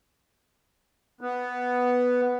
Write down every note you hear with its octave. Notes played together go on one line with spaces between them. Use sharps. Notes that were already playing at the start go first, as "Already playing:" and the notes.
B3